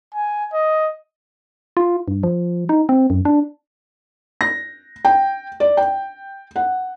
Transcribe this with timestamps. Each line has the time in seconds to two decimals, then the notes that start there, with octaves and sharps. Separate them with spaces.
0.15 G#5
0.53 D#5
1.77 F4
2.08 G2
2.23 F3
2.69 D#4
2.89 C4
3.10 F#2
3.25 D4
4.41 A#6
5.05 G5
5.60 D5
5.77 G5
6.56 F#5